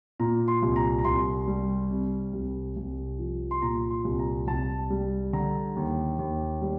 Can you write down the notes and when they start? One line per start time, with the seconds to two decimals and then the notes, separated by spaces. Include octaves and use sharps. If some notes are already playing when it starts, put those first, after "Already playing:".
0.20 A#2 A#5
0.48 C6
0.62 C2
0.76 A#5
0.99 A#5
1.04 C2 C6
1.48 G3
1.90 C3
2.33 C2
2.76 C2
3.19 F3
3.51 C6
3.62 A#2 A#5
3.90 C6
4.05 C2
4.19 A#5
4.47 C2 A5
4.90 G3
5.33 D3 A#5
5.76 D#2
6.19 D#2
6.62 G3